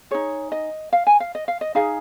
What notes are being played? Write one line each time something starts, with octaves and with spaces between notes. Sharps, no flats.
D#4 G#4 C#5
D#5
F5
G#5
F5
D#5
F5
D#5
D#4 G#4 F5